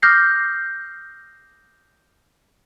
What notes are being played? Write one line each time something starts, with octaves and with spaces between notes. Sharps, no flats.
D6 D#6 F6 G6 A#6 C7